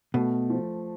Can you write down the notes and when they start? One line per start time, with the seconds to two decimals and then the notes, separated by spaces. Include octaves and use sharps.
0.14 B2 A3
0.50 F3